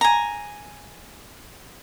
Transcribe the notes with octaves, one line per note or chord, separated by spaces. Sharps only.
G#5 A#5